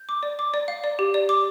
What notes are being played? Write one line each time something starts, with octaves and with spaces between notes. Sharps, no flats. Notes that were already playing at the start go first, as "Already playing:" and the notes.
Already playing: G6
D6
D5
D6
D5
F5
D5
G4
D5
D6